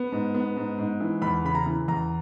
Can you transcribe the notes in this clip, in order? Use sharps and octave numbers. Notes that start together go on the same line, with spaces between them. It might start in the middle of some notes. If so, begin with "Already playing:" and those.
Already playing: B3
G#2
B3
G#2
G#2
E3
E2 B5
C#3 B5
A#5
E3
E2 A#5